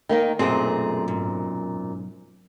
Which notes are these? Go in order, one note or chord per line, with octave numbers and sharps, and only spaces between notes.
D#3 A#3 D#4
B1 F#2 A#2 A3 C4 G#4
G#2